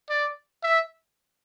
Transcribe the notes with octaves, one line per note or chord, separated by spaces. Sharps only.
D5
E5